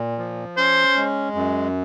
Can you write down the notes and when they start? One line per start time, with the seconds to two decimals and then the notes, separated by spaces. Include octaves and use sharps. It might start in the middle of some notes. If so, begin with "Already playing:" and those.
Already playing: A#2
0.18 F3
0.57 C#4 C5
0.96 G#3
1.35 F#2